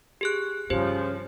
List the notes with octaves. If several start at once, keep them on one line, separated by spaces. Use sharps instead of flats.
G4 G#4 F#6
G2 C#3 F3 G4 C5